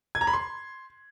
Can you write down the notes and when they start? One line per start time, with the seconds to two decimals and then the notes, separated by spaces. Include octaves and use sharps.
0.15 G#6
0.21 A#5
0.27 B5
0.33 C6